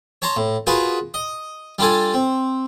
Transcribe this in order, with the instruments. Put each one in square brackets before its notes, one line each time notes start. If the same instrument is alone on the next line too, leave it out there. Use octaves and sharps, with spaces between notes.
[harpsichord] C#5 A5 A#5 C6
A2
F4 F#4 G#4 A#4 B4
D#5
G3 D4 F4 A4 G#5
C4